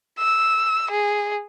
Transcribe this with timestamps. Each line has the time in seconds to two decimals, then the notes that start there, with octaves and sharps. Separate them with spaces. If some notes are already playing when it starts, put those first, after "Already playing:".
0.19 E6
0.91 G#4